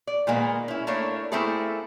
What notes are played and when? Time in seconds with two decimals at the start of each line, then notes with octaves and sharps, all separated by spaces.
0.07 D5
0.27 A#2 D#3 G#3 A#3 B3
0.68 C#4 E4
0.87 A3 A#3 D4 E4 C#5
1.32 A3 A#3 C4 E4 G#4 A4